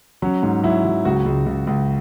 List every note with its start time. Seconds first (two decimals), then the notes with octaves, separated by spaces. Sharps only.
0.22 F#3 C#4
0.43 G#2
0.63 F#3 E4
0.85 F#3
1.05 C#2 F#4
1.26 C#2
1.46 C#2
1.67 C#2